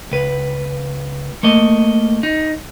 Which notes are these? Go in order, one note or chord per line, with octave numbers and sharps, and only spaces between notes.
C#2 B4
A3 A#3 D#5
D#4